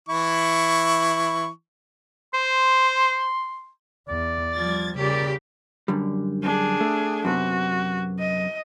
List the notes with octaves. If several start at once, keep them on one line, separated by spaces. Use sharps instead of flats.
E3 E4 C#6
C5 C6
E2 D5
F3 G3 G#6 A6
A#2 C#3 G4 D5
F#2 D3 G3
D4 G#4
A3
F#2 C3 B3 F#4
D#5